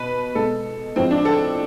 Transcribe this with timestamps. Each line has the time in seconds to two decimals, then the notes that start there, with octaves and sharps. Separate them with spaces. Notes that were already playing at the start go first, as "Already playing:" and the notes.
Already playing: B2 B4
0.35 B2 G#3 A4
0.96 A2 F3 G#3 C4
1.11 D4
1.25 A4